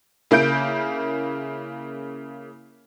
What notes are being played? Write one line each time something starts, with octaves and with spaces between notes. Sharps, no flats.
C#3 A#3 E4 G6 D7